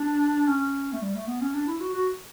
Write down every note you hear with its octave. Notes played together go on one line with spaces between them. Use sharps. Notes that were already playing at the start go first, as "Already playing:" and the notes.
Already playing: D4
C#4
A3
G3
A3
B3
C#4
D4
E4
F#4
F#4